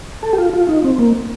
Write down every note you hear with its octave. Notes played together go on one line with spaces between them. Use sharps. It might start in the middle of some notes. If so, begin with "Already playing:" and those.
A4
G4
F4
F4
D#4
C4
A#3